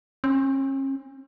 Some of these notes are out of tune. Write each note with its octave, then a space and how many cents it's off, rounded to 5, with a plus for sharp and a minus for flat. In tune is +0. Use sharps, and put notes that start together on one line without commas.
C#4 -40